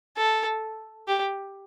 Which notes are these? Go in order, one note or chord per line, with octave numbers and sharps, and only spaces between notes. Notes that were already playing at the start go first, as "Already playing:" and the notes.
A4
G4